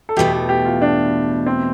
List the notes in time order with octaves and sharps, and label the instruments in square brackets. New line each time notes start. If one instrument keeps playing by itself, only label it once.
[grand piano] A4
[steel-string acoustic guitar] E2 B2 A3 [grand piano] G4
[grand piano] G4
G4
F4
D4
C4